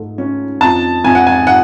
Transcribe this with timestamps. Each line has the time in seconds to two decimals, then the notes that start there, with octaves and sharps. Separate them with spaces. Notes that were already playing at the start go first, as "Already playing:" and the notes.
Already playing: G#2 A3
0.18 C#4
0.61 F2 A5
1.04 F2 G#5
1.15 F#5
1.27 G#5
1.47 F#5